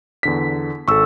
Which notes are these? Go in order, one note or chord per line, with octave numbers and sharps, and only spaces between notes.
E2 D3 B6
G#1 A4 C#6 E6